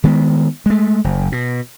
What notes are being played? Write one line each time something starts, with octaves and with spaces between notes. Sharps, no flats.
D#3 G#3 B3
G#3 A3
F#1
B2